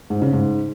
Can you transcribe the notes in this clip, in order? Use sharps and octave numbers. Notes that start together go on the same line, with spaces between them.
G#2
C#3
G#2